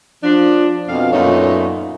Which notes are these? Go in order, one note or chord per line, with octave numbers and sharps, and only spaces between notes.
F3 D4
F2 B2 F5
F#2 A#2 A3 B3 D#4 C#5